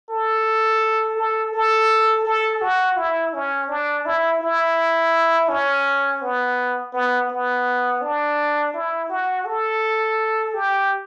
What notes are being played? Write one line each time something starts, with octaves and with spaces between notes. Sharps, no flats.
A4
A4
A4
A4
F#4
E4
C#4
D4
E4
E4
C#4
B3
B3
B3
D4
E4
F#4
A4
G4